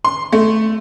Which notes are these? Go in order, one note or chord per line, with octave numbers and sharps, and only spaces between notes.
C6
A3